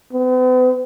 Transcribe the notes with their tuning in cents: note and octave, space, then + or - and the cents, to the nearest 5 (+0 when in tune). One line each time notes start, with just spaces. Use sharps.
B3 +45